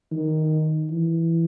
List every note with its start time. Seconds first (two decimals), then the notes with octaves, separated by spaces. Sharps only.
0.12 D#3
0.91 E3